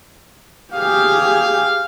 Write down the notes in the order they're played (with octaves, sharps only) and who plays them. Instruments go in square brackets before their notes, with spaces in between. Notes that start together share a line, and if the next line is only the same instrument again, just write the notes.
[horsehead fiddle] G4 G#4 [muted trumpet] F5